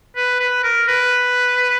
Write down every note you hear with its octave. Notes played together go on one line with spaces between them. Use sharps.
B4
B4
A#4
B4